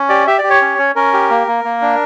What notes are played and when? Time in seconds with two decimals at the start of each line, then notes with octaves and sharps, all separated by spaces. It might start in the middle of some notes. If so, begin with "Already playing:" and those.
Already playing: C#4
0.09 G4 D5
0.27 G4 E5
0.39 D5
0.44 G4
0.50 C#5
0.62 C#4
0.79 C#4
0.96 C#4 A#4
1.13 G4
1.30 A#3
1.47 A#3
1.64 A#3
1.82 D4